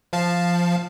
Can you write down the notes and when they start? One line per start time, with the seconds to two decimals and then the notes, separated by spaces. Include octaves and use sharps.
0.13 F3 F5 A5